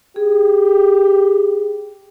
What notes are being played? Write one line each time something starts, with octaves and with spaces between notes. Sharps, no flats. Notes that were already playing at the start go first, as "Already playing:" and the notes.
G4 G#4